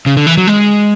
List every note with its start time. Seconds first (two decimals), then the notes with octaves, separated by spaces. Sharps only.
0.06 C#3
0.17 D3
0.27 E3
0.37 F#3
0.47 G#3